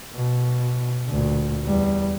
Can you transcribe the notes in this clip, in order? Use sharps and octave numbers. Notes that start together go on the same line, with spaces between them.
B2
D2 A#2
E2 G3